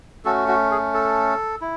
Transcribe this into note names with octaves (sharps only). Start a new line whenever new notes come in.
A3 C#4 F#4 A4
F#4
G#4
A4
E4